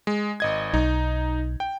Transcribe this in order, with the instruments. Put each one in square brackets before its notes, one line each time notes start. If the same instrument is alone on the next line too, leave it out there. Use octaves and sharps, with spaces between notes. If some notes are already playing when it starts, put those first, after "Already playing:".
[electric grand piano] G#3
G#1 D#5 G#6
[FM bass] B1 [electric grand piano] D#4
[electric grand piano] G5